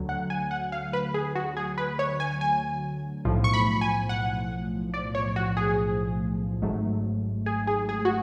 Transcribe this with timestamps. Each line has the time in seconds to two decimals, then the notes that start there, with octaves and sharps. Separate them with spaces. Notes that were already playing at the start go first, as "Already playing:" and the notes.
Already playing: D2 D3 F#3
0.09 F#5
0.30 G#5
0.51 F#5
0.72 F5
0.93 B4
1.14 G#4
1.35 F#4
1.57 G#4
1.78 B4
1.99 C#5
2.20 G#5
2.41 G#5
3.25 B1 A2 F3
3.44 C#6
3.53 B5
3.81 G#5
4.09 F#5
4.94 D5
5.15 C#5
5.36 F#4
5.57 G#4
6.62 G#1 G#2 F#3 A3
7.46 G#4
7.67 G#4
7.89 G#4
8.05 F#4